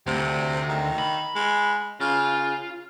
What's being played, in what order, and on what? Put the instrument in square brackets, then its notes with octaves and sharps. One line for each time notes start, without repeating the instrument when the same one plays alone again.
[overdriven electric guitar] D2 [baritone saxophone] C3
[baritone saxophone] D#3
[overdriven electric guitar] B5
[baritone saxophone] G#3
[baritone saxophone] C#3 [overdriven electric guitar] F4